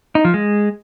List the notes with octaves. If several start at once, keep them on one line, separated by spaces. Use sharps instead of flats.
D#4
F3
G#3